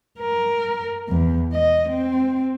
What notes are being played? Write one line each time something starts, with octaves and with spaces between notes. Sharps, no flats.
A#4
E2
D#5
C4